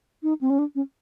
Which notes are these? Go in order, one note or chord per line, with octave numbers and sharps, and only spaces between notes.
D#4
C4
C#4
D4
C#4